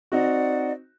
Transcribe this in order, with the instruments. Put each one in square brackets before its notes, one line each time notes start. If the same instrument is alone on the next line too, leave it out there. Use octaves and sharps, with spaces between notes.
[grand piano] C4 D#4 F#4 [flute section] D5 F#5